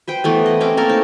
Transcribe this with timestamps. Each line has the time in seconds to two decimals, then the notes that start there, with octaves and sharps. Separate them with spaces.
0.08 B4 C5 G5
0.24 E3 A3 B3
0.46 D#5
0.61 C4 C#4 D6
0.77 A3 A#3 A4 A#4
0.89 D#4